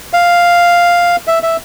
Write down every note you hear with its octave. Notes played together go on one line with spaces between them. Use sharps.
F5
E5
E5